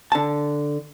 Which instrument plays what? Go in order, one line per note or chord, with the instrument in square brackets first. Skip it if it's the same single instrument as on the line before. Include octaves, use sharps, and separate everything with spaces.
[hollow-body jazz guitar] D3 A5